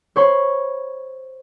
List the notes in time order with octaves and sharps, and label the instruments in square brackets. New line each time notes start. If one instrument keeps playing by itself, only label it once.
[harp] C5 C#5 B5 C6